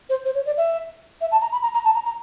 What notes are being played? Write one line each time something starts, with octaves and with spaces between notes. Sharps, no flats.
C5
C5
C#5
D5
E5
E5
A5
A#5
B5
A#5
A#5
A5
A#5
A#5